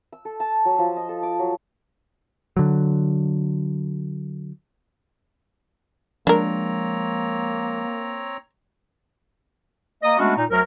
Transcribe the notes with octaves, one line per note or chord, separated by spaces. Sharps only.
E6
A4
A5
F#3
F3
D#5
A4
D6
F#3
D3 F#3
F3 G#3 A#3 C4 D4 A#4 C#5 A#5
A#3 D#5
G#3 A3 B3 C#4 D4 F#4
A#2 D#4
D2 F#3 A#4